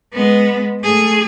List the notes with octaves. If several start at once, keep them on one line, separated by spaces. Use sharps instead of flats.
G#3 B3
A3 G#4